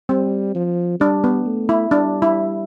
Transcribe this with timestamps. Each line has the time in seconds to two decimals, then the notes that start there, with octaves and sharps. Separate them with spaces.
0.09 G3 C4
0.55 F3
1.00 G3 D4
1.24 B3
1.46 A3
1.69 E4
1.91 G3 D4
2.22 E4